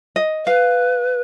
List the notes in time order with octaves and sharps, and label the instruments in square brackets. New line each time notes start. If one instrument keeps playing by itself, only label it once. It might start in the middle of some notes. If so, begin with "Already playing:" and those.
[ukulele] D#5
[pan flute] B4 [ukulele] F5